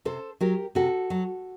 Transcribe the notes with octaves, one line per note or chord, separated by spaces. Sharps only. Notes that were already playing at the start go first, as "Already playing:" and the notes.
C3 A4 C5
F#3 G4 A#4
C3 F#4 A4
F#3